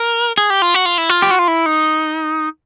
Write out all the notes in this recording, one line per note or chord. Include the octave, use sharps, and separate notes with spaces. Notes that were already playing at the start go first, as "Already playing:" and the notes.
Already playing: A#4
G#4
G4
F4
F#4
F4
E4
F4
G4
F#4
F4
E4
D#4